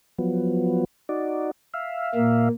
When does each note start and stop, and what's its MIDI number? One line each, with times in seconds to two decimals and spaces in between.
0.18 0.85 53
0.18 0.85 54
0.18 0.85 59
1.09 1.51 63
1.09 1.51 66
1.09 1.51 74
1.74 2.49 76
1.74 2.49 77
2.15 2.48 46
2.15 2.48 58